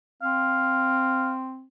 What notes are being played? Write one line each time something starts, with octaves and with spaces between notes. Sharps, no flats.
C4 F5